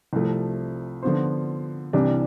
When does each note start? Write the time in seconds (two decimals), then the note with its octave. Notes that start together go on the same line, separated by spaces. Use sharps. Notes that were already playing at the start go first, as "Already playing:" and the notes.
0.13 C2 C3 F3 A3
1.03 D3 F3 B3 F4 C5
1.93 C2 C3 E3 G3 D4